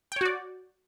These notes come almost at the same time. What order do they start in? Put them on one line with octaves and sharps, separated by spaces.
G5 C#5 F#4 D5